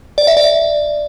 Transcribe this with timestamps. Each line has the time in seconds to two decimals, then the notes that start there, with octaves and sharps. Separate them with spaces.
0.18 D5
0.27 E5
0.37 D5